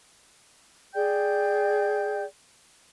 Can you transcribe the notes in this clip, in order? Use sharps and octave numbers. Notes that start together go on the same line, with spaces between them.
G#4 D5 G5 G6